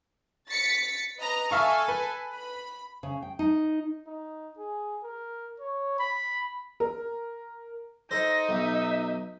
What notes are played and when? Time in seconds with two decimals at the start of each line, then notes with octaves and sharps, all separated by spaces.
0.49 A6 B6 C#7
1.18 B4 D#5 A#5
1.51 A4 E5 F5 G#5 C#6
1.88 B4
2.34 B5
3.03 C#3
3.22 G5
3.39 D#4
4.06 D#4
4.58 G#4
5.03 A#4
5.60 C#5
5.99 B5
6.80 A#4
8.11 D#4 A4 C5 A#6
8.49 B1 E5